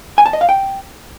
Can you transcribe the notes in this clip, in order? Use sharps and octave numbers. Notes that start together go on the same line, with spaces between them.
G#5
A5
D#5
F5
G5